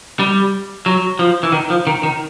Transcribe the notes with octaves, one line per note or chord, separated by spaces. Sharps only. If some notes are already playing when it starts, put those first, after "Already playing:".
G3
F#3
F3
E3
D#3
F3
D#3
D#3